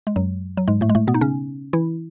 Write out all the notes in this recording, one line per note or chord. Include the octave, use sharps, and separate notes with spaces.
G#3
F#2 F#3
F#3
G#2 G#3
A2 A3
G#3
A2 A3
B2 B3
D#4
C#3 C#4
E3 E4